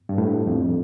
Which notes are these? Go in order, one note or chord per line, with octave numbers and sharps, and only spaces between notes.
G2
A2
F2